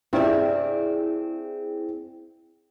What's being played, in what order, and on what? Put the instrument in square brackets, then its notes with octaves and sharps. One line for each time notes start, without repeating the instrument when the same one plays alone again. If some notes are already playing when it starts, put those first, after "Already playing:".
[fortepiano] G2 C3 [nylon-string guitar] C4 D5 E5 [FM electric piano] E4 G#4